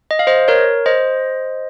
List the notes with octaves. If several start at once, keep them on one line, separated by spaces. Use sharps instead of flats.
D#5
F5
C5 D#5
A#4 C#5
C5 D#5